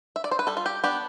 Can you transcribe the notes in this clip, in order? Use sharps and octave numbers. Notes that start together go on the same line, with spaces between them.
E5
D5
C5
B4
G3 A4
F4
G4
B3 D4 G4